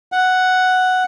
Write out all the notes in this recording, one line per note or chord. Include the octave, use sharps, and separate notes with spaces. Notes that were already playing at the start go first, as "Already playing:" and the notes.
F#5